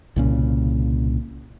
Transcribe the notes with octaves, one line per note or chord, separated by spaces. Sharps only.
C2 A#2 C#3